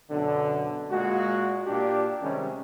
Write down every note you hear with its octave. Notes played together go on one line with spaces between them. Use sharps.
F#2 B2 D3
A#2 G#3 F#4
A#2 D4 G4
C3 D#3 G3 G#3 C#4